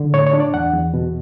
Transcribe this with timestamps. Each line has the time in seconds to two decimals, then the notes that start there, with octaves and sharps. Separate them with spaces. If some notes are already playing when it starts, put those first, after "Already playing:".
Already playing: D3
0.14 A2 C#5
0.27 C#5
0.33 D4
0.40 D5
0.54 E2 F#5
0.73 E2
0.94 B2